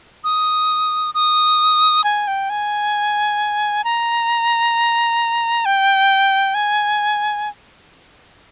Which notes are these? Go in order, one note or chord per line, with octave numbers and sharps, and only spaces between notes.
D#6
D#6
G#5
G5
G#5
A#5
G5
G#5